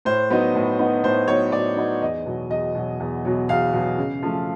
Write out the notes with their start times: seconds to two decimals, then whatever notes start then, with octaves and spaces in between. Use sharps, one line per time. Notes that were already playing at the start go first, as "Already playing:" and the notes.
0.05 A2 C5
0.30 F#3 B3 D#4
0.55 A2
0.79 F#3 B3 D#4
1.04 A2 C5
1.28 F#3 B3 D#4 C#5
1.52 A2 D5
1.76 F#3 B3 D#4
2.02 E2 D#5
2.26 B2 F#3
2.50 E2 D#5
2.75 B2 F#3
3.00 E2
3.25 B2 F#3
3.49 E2 F5
3.73 B2 F#3
3.98 C#3
4.23 F3 A3